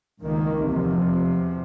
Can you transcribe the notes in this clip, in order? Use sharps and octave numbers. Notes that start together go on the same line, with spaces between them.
C#2 D#3 A#3
E2 C3 F3